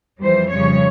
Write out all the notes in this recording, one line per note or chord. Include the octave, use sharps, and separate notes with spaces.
F2 E3 G3 C5
F2 C#3 G3 C#5